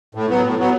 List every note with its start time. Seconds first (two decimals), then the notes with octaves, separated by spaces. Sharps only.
0.15 A2
0.29 F#3 B3
0.44 A2
0.58 F#3 B3